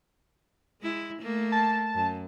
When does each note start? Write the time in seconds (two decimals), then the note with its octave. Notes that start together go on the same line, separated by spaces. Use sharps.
0.81 G#3 E4
1.19 A3 A#3
1.52 A5
1.95 F#2